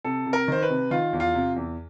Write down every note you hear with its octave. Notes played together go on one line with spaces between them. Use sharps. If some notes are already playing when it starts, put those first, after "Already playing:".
C3 A4
C3
A#4
D#3 C5
B4
C3
D#3 F4
E2
F4
C3
E2